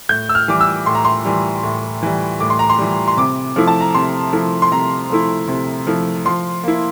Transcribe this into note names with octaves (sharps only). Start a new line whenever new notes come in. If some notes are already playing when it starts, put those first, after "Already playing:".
A2 G6
E6
F6
E3 G3 D6
E6
A2 C6
A#5
C6
E3 G3
A2
E3 G3
A2 D6
C6
A#5
C6
E3 G3
C6
C3 D6
F3 A3 E4
A5
A#5
C3 C6
F3 A3 E4
C6
C3 A#5
F3 A3 E4
C3
F3 A3 E4
F3 C6
A#3 E4